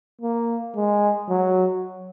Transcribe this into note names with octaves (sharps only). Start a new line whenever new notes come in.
A#3
G#3
F#3